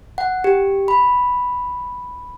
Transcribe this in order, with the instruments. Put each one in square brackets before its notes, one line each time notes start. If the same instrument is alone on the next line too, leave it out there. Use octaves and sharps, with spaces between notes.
[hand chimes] F#5
G4
B5